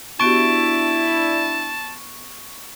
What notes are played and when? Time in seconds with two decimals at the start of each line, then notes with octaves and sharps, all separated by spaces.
0.20 B3 D4 E4 F#4 G4 A5 C#6 D7